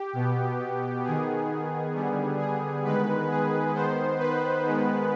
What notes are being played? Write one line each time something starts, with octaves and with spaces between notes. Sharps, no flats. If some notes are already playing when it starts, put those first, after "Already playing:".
Already playing: G4
B2 B3
D#3 B3 G#4
D3 G3 B3
G#4
D#3 G#3 B3 B4
G#4
D#3 B3 C5
B4
D#3 G#3 B3